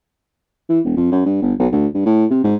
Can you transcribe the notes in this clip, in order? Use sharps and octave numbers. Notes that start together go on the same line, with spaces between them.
E3
E1
F2
F#2
G2
G1
B1
D2
G2
A2
C3
G#2